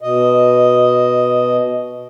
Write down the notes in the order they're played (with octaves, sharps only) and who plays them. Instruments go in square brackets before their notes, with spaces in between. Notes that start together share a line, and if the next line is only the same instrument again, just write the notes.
[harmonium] B2 D#5